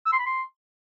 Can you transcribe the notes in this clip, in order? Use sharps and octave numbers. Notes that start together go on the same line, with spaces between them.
E6
C6
B5
C6